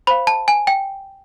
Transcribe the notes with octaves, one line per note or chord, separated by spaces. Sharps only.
C5 F5 B5
A5
G#5
G5